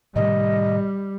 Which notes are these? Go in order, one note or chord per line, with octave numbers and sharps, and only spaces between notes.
A2 C3 D#3 G3 D#5